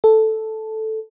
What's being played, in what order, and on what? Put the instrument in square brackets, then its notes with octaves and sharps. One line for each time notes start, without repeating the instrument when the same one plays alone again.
[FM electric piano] A4